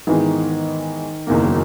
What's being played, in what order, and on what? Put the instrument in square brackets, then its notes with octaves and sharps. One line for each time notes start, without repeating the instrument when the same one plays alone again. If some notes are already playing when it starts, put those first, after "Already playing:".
[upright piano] G#2 E3 G#3 B3 [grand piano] D#3
[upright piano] F#1 E2 D#3 A#3
[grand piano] F#3